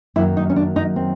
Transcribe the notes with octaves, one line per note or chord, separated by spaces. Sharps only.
F#2 D#3 F#3 A#3 E4
D#4
C#4
D4
D#4
C4